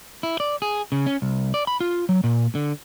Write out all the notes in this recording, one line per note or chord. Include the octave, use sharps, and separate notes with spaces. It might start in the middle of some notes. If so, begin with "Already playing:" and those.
E4
D5
G#4
C#3
C#4
C2
D5
B5
F4
F#3
A#2
D3